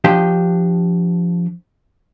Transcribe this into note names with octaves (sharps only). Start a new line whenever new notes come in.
F3 D4 G4 D#5 G5